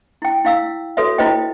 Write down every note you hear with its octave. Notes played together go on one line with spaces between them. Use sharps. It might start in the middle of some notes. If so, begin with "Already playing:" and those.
E4 G5
E4 F5 E6
F#4 A4 B4 C#5 E5
E4 F4 B4 C5 D#5 G5